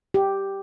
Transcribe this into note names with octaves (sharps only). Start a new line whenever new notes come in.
G4